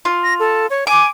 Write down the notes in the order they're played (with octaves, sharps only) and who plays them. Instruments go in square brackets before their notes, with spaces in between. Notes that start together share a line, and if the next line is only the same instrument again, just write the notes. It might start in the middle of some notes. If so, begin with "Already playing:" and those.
[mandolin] F4
[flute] A#6
A4
C#5
[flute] G#5 [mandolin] D6